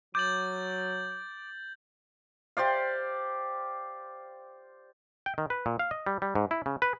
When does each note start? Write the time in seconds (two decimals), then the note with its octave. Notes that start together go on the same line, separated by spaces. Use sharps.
0.15 F#3 D6 G6 A6 F#7
2.57 G4 C5 D5 F5
5.26 G5
5.38 D#3
5.50 B4
5.66 A#2
5.79 F5
5.91 D#5
6.06 G3
6.22 G3
6.35 G#2
6.51 E4
6.66 C#3
6.82 B4